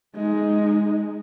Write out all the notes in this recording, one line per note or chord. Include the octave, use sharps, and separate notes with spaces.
G#3 D#4